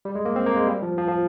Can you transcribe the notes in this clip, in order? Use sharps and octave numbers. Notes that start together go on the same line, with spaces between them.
G3
G#3
A#3
C4
A#3
G#3
G3
F3
F3
F3